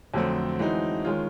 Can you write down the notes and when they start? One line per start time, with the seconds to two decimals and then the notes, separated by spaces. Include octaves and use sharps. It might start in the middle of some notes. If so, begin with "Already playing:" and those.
0.14 F2 D3 F#3 A3 C4
0.59 E3 G#3 C4 D#4 F#4
1.05 D#3 G#3 C#4 F4